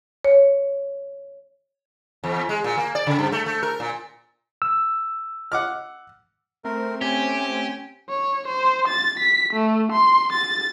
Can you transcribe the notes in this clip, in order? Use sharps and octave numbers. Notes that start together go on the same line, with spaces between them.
C#5
E2
G#3
A#2
A#3
D5
C#3
G2
A3
A3
A#4
A#2
E6
F#5 D6 F6
A3 C4 A#4
C#4 G4 G#5
C#5
C5
A6
B6
A3
C6
A6